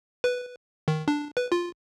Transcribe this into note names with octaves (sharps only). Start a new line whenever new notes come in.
B4
D#3
D4
B4
F4